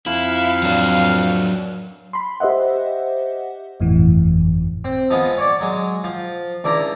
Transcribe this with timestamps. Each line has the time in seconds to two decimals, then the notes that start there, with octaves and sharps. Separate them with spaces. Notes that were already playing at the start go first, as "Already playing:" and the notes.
0.06 F2 E4 F5
0.63 F#3 D4
2.13 B5 C6
2.40 G4 C5 D#5 E5 F#5
3.80 G1 F2 A2 E3
4.85 C4
5.10 F3 G#3 B3
5.38 C#5 D5
5.60 F#3 G#3
6.04 F3
6.64 C#2 D4 E4 A#5